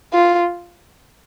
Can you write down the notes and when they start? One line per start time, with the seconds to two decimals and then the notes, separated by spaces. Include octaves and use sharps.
0.13 F4